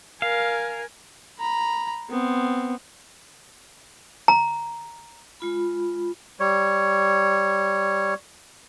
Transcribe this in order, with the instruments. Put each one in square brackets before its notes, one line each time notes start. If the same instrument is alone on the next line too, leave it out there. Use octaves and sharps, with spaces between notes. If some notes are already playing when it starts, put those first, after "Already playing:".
[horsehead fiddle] A#4 G#5 [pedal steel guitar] F5
[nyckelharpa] A#5 B5
B3 C4
[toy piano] A#5
[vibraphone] G#3 F4 B5
[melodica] G3 C#5